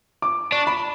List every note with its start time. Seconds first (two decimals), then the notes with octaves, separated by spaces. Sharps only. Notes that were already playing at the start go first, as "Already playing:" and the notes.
0.22 D6
0.52 D4 C#6
0.67 B5